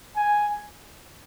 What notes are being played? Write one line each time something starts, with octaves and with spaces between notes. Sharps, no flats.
G#5